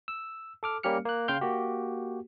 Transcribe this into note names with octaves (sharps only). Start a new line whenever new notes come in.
E6
A4 D6 F6
G3 A#3 C#4 G4 F6 C#7
A#3 F#6
C#3 F5 G5 C6 F6 G6
A#3 F#4 G4